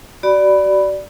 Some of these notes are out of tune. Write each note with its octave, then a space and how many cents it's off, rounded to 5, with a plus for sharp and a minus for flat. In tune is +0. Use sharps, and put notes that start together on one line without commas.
F#4 +35 D5 +0 B5 +0